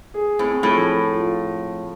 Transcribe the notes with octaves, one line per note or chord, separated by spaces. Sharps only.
G#4
A2 C4
A2 F3
A4
F4